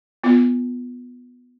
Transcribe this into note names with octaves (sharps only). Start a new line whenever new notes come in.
B3 F4